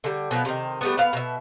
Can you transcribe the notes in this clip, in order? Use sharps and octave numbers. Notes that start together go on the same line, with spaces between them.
D3 G3
B2 F3 F#3
C3 D#3
G3 A3 B3
B3 F5
B2 E5